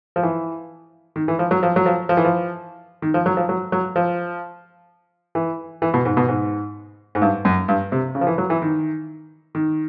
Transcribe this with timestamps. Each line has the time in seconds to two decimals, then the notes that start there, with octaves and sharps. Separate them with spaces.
0.16 F3
0.23 E3
1.16 D#3
1.28 E3
1.39 F3
1.51 F#3
1.63 F3
1.76 F#3
1.86 F3
2.09 F3
2.17 E3
2.25 F3
3.02 D#3
3.14 F3
3.26 F#3
3.37 F3
3.49 F#3
3.72 F#3
3.96 F3
5.35 E3
5.82 E3
5.94 B2
6.05 G#2
6.17 B2
6.29 G#2
7.15 G#2
7.22 G2
7.45 F#2
7.68 G2
7.92 C3
8.15 C#3
8.21 F3
8.27 E3
8.38 F#3
8.50 E3
8.62 D#3
9.55 D#3